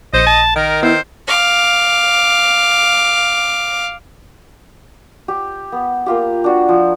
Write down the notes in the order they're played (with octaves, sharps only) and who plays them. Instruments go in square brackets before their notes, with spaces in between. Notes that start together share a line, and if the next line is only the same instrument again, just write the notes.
[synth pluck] A#1 G6 C#7 [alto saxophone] C5 [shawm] D#5
[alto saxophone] A5
[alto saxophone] D#3 [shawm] A#4
[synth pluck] B3 E4 E6 [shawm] C5
[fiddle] F5 D6
[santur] G4
B3
A#3 F4 G4
D4 F#4
F3